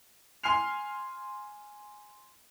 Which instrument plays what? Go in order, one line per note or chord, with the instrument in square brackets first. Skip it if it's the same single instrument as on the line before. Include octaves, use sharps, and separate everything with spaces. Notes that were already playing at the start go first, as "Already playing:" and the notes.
[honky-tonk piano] G#5 C6 F6 C7 F7